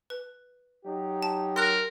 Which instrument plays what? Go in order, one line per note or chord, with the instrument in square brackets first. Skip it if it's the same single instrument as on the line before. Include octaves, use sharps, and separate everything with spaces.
[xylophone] B4
[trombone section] F#3 D#4 G4
[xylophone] A5
[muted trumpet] A#4 [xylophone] C6 F#6